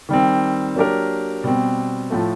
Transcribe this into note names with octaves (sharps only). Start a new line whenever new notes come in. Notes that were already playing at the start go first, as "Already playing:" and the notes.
D#3 G3 C4
F#3 A#3 D4 G4 A#4
B2 G3 C4
A2 F3 A3